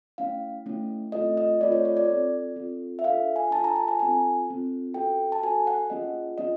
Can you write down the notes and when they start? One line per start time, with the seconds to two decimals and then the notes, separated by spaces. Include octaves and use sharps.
0.18 A3 C#4 E4 F5
0.66 A3 C#4 E4
1.12 A3 C4 F4 A4 D#5
1.37 D#5
1.61 A3 C4 F4 A4 D5
1.72 C#5
1.85 C#5
1.97 D5
2.09 C4 F4 A4
2.56 C4 F4 A4
2.99 E5
3.04 D4 F4 A4 F5
3.36 G#5
3.51 D4 F4 A4 A5
3.64 A#5
3.76 A5
3.88 G#5
3.99 C4 F4 A4 G#5
4.48 C4 F4 A4
4.94 C#4 F#4 A4 G5
5.32 A5
5.43 C#4 F#4 A4 G#5
5.67 F#5
5.90 A#3 C#4 F4 G#4 D#5
6.38 A#3 C#4 F4 D#5